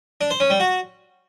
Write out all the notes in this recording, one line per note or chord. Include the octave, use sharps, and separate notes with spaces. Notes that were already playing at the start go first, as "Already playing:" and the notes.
D4
C5
C#4
G3
F#4